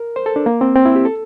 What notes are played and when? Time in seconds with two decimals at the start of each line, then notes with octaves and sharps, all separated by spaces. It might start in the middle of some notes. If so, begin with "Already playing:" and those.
Already playing: A#4
0.16 C5
0.26 A4
0.36 D4
0.46 A#3
0.61 C4
0.75 C4
0.85 E4
0.96 G4
1.05 A4